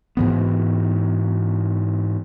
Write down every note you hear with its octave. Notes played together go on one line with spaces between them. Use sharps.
G#2 E3 B3